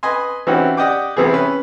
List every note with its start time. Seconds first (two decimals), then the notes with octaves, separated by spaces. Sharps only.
0.03 B4 D#5 G#5 C6
0.47 E3 C4 C#4 D#4 F#4 G4
0.77 G4 D5 D#5 F#5 G5 D6
1.17 C2 E3 B3 G#4
1.33 C#4 B4